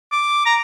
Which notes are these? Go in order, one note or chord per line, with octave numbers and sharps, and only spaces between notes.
D6
A#5